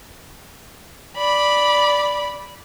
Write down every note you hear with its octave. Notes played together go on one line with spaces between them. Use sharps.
D5 B5